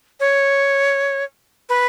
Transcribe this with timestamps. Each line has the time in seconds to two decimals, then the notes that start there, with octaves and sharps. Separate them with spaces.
0.20 C#5
1.69 B4